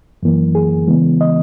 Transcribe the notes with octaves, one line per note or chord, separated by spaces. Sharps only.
F#2 E3 A#3
G#4
C#3 E3 G#3 B3
D#5